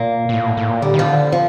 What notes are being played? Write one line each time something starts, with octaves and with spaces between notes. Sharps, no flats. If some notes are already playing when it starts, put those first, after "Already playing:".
Already playing: A#2 A#3
A#2
A2
A#2
A2
A2
A#2
D3 G3
D#3
D3 F3
F3